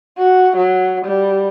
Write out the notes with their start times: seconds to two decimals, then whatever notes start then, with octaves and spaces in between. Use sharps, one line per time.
0.18 F#4
0.56 F#3
1.05 G3